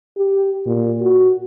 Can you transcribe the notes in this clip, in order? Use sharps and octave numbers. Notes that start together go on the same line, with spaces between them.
G4
A#2
F#4